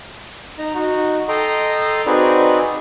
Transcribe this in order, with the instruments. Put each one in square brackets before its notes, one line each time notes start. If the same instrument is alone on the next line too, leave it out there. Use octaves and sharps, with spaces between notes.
[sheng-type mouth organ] D#4 A#5
D#4 F#4
A4 D#5 G5 A#5 C6
C4 D#4 F#4 G#4 B4 D5